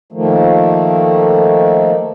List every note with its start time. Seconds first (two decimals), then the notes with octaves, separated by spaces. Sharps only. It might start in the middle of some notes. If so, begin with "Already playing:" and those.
0.12 D#3 F3 A3 A#3